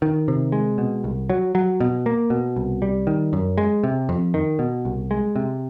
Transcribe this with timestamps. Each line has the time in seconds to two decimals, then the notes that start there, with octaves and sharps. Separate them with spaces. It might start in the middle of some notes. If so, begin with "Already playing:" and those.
0.02 D#3
0.28 C3
0.52 G#3
0.78 B2
1.04 C2
1.30 F#3
1.55 F#3
1.80 B2
2.06 A#3
2.30 B2
2.56 C2
2.82 G3
3.07 D#3
3.33 F#2
3.58 G#3
3.84 C3
4.09 F2
4.34 D#3
4.59 B2
4.85 C2
5.11 G#3
5.36 C3